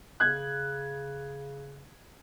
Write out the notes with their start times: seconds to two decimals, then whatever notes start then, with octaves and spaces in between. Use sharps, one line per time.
0.20 C#3 F#6 G#6